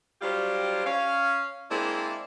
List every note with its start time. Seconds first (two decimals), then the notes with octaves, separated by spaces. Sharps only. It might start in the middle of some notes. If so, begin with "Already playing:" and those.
0.22 F#3 G3 D4 F4 G4 C5
0.85 C#4 F5
1.71 G#3 A#3 C4 D4 E4